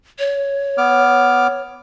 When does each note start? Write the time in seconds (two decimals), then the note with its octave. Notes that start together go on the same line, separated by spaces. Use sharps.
0.19 C#5
0.78 B3 D6 F6